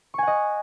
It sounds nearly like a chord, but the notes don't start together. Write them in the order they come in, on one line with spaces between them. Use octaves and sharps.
C#6 G#5 F#5 D#5